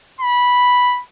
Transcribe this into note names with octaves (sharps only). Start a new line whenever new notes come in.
B5